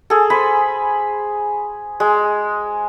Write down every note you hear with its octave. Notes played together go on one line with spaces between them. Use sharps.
G#4 A4
C5 G#5 B5 C6
G#3